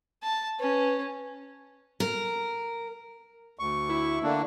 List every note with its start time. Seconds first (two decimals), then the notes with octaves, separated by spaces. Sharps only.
0.23 A5
0.60 C#4 B4
2.00 A#4
3.59 D2 C#6
3.89 E4
4.23 D3 A#3 D4